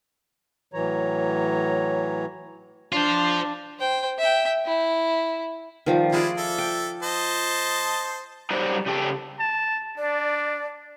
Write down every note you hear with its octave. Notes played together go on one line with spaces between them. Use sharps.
A2 E3 F#3 C#5 A#5
D4 F4 C5
C5 G5
E5 G5
E4
D#3 F3 G3
G#3 E4 F4 G#4 D5
A4 E5
G5
C5 D#5 A5
F#3 G3 D#4 C5 D5
C#3 A3 G4 A4 G5
A5
D4 D5